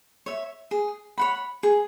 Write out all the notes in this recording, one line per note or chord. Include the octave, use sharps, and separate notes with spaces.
C#5 E5
G#4
C#5 F#5 B5
G#4